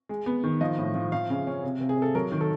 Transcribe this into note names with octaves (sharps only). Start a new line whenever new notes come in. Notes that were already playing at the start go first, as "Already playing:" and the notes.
G#3
B3
D#3
F3 D#5
A2
F3
F3 F5
C#3
C#4
C3
C3
G#4
C3 A4
F#3 A#4
D#3
A4